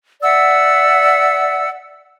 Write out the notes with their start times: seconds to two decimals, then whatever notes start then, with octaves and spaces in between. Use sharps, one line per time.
0.22 D5 E5 F#5 E6